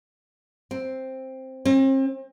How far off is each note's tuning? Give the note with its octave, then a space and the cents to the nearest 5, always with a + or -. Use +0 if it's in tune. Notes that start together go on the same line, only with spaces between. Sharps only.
C4 +5
C4 +40